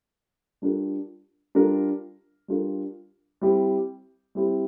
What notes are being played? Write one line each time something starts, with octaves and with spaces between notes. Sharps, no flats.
G3 D4 F4 A#4
G3 D4 F4 A#4
G3 D4 F4 A#4
G3 C4 E4 G4
G3 C4 E4 G4